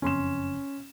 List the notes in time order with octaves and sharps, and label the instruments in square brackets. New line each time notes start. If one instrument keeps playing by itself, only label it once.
[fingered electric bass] F#1 F2 C4 [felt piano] C#4 C6 E7